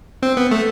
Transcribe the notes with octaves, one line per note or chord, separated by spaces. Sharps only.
C4
B3
A3